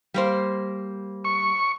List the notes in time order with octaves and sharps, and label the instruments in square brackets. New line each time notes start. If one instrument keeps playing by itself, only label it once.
[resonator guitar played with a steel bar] G3 A#3 C5
[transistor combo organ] C#6